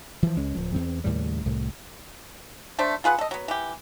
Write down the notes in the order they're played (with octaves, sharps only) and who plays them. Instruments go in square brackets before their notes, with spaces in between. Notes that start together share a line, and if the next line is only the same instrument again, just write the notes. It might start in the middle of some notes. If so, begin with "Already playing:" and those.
[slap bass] E3 F3
C#2 G#3 C#4
D1 F3
E2 C4
D#2 A2 C#3 G3
C2 A2
[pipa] A3 D4 C5
F4 G#4 B4 F#5
A4 D#5
F#3 B3
E3 G4